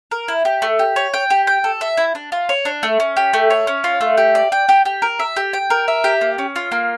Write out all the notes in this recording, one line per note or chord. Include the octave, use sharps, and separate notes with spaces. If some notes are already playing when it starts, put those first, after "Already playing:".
A#4
E4
G4
A3
G4
C#5
G5
G4
G5
A4
E5
E4
D4
F4
C#5
D4
A3
C#4
G4
A3
C#5
C#4
F4
A3
G4
D5
G5
G4
G4
A#4
E5
G4
G5
A#4
E5
G4
A#3
C#4
F4
A#3